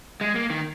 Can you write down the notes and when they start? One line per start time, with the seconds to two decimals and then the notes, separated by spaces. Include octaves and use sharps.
0.21 G#3
0.35 A#3
0.50 D#3